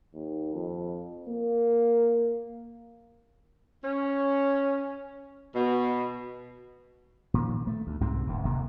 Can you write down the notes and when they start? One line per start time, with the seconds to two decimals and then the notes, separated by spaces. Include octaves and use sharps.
0.13 D#2
0.54 F2
1.29 A#3
3.83 C#4
5.55 B2
7.34 A#2 D#3 F3
7.67 A3
7.87 D2
8.01 C2 G#2 C3 C4
8.27 D1 D2
8.44 E1 D2 C3 A#3